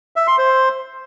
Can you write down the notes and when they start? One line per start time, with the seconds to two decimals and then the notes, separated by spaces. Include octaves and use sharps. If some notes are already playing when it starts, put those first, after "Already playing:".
0.16 E5
0.27 C6
0.38 C5